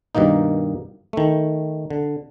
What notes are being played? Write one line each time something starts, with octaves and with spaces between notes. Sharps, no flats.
G2 B2 D#3 A#3 D#4
D#3 A3
D3